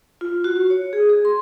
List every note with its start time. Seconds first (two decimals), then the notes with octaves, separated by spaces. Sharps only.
0.21 F4
0.44 F#4
0.70 C#5
0.93 G#4
1.09 G#4
1.25 C6